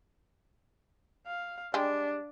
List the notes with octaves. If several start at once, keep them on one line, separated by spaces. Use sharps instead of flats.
F5
G3 G#3 D4 G4